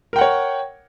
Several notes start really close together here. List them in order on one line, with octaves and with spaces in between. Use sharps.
A#4 G5 F#5 C#5